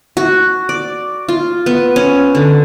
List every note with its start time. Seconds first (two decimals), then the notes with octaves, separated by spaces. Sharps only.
0.17 F#4
0.69 D5
1.29 F4
1.66 B3
1.96 C#4
2.35 D3